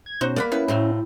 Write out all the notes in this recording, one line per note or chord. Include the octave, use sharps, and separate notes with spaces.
G#6
B2 C#4 D#4 F#4 C5
A#3 D5 F#5 B5
B3 C#4 E4 B4
A2 C#3 F#3 C4